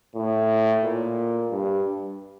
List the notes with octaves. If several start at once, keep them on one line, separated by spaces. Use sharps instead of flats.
A2
A#2
G2